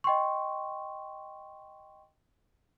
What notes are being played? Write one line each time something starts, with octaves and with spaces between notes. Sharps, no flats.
D#5 G5 C6 C#6